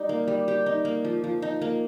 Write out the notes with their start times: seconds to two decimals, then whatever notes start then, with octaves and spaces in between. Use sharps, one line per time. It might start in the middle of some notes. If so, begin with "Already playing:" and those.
Already playing: G3 D#4 G4
0.09 A#3
0.28 G3
0.48 G4
0.66 D#4
0.85 A#3
1.05 F3
1.24 F3
1.42 D#4
1.62 A#3